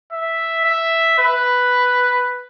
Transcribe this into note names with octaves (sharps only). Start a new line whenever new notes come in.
E5
E5
B4